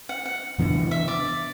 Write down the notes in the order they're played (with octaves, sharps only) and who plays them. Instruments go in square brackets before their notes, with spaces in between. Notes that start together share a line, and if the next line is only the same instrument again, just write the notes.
[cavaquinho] F#5
F#5
[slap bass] C3 E3 B3 D4
[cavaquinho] E5
D5